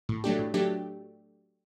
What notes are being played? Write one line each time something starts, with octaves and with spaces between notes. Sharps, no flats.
A2
F#3 A3 D4 G4
A2
F#3 A3 D4 G4